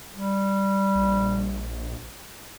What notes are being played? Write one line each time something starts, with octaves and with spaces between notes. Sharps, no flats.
G3
A#1